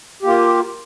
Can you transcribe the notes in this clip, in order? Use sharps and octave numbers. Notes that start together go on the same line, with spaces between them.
A#3 F4 G4